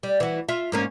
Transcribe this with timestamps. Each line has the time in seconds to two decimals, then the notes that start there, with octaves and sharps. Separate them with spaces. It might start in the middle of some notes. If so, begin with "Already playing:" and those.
0.03 G3
0.20 E3 F#4
0.49 F4 E5
0.72 G#2 A#3 C#4